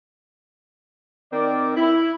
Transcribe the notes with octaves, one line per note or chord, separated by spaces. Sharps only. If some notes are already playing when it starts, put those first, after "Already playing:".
D#3 C4 A#4 D5
E4